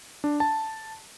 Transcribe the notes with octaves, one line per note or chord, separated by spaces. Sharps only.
D4
A5